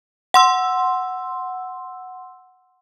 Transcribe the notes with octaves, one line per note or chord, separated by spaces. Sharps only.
F#5 C6 E6